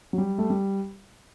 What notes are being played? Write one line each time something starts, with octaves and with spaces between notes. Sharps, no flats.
F#3
G3
A3
G3